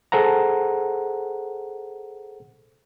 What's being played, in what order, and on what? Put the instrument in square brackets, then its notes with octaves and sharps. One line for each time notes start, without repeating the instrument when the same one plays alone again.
[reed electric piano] G#4 A4 C5 F#5 A#5